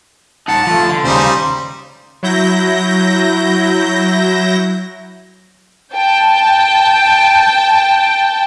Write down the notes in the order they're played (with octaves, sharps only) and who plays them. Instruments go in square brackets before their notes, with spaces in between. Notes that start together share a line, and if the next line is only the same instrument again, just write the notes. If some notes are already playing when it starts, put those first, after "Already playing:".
[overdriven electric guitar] D#4 F#5 [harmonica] A5
[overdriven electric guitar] F3 A3
D3
[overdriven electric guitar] D#2 C#3 [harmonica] G3 D#4 C5
[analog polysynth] F#3 E4 G6 A#6
[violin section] G5 A5